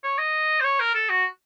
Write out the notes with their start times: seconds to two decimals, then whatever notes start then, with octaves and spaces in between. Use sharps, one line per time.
0.04 C#5
0.19 D#5
0.60 C5
0.64 C#5
0.80 A#4
0.95 A4
1.10 F#4